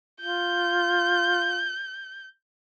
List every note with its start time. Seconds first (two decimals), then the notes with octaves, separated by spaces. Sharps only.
0.21 F4 G6